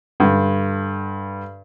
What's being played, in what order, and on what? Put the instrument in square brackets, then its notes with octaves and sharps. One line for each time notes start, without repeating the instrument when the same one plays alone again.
[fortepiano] G2 D3